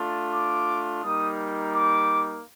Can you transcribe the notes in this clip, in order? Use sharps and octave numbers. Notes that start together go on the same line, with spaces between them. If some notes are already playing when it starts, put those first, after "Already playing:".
Already playing: A3 D4 F4
D6
G3 A#3 D#4 D#6
D6